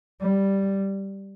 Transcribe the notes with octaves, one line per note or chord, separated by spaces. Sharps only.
G3